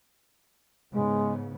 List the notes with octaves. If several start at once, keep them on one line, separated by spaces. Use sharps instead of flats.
G#2 C#3 G#3 B3